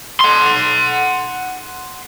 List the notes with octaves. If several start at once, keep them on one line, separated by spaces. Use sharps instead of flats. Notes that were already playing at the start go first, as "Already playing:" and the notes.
F#5 C6